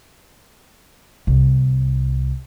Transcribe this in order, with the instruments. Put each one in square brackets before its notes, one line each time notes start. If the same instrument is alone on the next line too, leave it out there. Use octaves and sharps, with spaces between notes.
[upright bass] C2